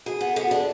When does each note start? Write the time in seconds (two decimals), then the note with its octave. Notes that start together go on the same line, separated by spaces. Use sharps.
0.06 F#4 G#4
0.21 B3
0.31 A4
0.36 B3 G#4
0.46 F#4
0.51 D4
0.56 G#4